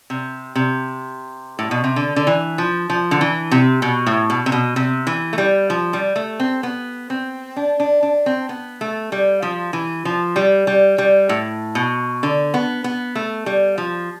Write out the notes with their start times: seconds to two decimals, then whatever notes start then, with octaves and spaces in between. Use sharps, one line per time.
0.10 C3
0.55 C3
1.59 A2
1.71 B2
1.84 C3
1.96 D3
2.16 D3
2.27 E3
2.58 F3
2.90 F3
3.11 D3
3.21 E3
3.51 C3
3.82 B2
4.07 A2
4.30 B2
4.46 C3
4.52 B2
4.76 C3
5.07 E3
5.33 A3
5.38 G3
5.70 F3
5.93 G3
6.16 A3
6.40 C4
6.63 B3
7.10 C4
7.56 D4
7.80 D4
8.03 D4
8.26 C4
8.49 B3
8.81 A3
9.12 G3
9.42 F3
9.73 E3
10.05 F3
10.36 G3
10.67 G3
10.98 G3
11.29 A2
11.75 B2
12.23 D3
12.54 B3
12.84 B3
13.15 A3
13.46 G3
13.78 F3